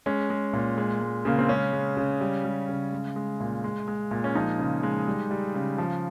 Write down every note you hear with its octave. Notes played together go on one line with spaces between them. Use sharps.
G#3 C#4
G#3
A#2
G#3
G#3
C#3 A#3
C4
G#3 C#4
G#3
C#3
G3
G3
C#3
G#3
G#3
A#2
G#3
G#3
A#2
C#4
F3 D#4
C#3
G#3
G3
G3
C#3
F3